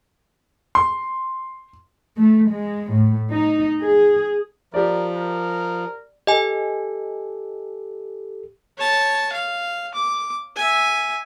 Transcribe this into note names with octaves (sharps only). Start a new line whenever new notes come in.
C6
A3
G#3
A2
D#4
G#4
F3 G4 A#4 D5
A#4
G4 A4 D#5 G#5
C#5 A5
F5
D6
E5 G#5